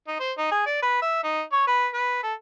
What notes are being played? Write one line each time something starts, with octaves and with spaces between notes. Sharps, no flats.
D#4
C5
D#4
G#4
D5
B4
E5
D#4
C#5
B4
B4
A4